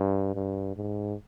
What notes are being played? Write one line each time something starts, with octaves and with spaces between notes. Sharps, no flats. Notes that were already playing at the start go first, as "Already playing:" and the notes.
Already playing: G2
G2
G#2